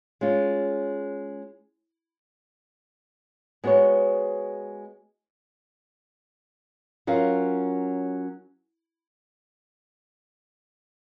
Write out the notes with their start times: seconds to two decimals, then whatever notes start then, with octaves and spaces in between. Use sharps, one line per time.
0.21 G#3 C#4 F4
3.64 G#3 B3 F#4 C#5
7.07 F#3 C#4 F4 A#4 F5